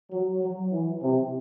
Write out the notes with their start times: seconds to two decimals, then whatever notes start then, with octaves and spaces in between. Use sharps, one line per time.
0.11 F#3
0.42 F#3
0.71 E3
1.02 C3